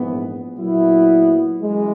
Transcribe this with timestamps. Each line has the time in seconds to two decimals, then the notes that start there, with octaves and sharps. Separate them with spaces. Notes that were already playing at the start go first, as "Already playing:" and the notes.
Already playing: A#1 G#2 E3 B3
0.56 A#2 F#3 B3 E4
1.62 F#2 E3 G#3